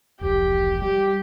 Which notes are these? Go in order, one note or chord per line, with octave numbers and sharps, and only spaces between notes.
E1 C2 F3 G4
G3 G4